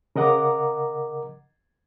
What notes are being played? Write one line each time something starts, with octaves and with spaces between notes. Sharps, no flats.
C#3 A#4 D#5 F#5 A#5 D6